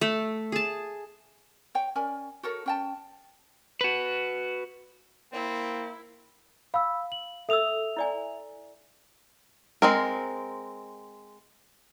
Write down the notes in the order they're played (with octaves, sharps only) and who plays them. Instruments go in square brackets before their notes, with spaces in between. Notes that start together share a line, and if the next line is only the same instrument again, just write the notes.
[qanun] A3
G#4 A5
[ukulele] C#5 G5
C#4 A#4 D5 G#5
F#4 A4 A#4 C#5
C#4 G5 A5
[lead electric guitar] F#4 B4
[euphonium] A#3 [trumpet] C4 [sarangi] E4
[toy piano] F5 [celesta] B5 E6
[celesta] F#7
[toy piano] A4 D#6 E6 [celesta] E5 F7
[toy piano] E4 D5 G#5
[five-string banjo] G#3 C4 A#4